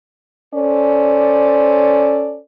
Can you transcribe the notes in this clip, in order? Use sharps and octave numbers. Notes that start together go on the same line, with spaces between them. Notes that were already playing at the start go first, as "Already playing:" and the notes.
C#4 A4 C5 D5